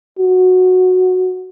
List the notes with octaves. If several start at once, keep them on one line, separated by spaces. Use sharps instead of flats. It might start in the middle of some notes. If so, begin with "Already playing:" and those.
F#4